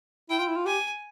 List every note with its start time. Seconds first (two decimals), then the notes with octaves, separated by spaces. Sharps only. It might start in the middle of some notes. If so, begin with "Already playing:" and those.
0.30 E4 G5
0.39 F4
0.48 E4
0.56 F4
0.66 G4 G#5